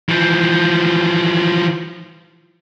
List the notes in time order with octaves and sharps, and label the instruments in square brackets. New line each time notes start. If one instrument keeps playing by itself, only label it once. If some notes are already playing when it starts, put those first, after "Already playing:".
[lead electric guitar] E3 F3